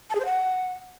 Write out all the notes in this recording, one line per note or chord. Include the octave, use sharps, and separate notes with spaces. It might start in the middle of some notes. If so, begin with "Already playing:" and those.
A5
G#4
C5
F#5